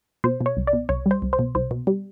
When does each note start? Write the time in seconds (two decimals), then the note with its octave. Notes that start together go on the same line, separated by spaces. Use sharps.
0.24 B2 C5
0.41 B2
0.46 C#5
0.57 C2
0.67 D5
0.73 B2
0.89 C2 C#5
1.06 G3
1.11 C5
1.22 C2
1.33 C5
1.39 B2
1.55 C2 C5
1.71 B2
1.87 G3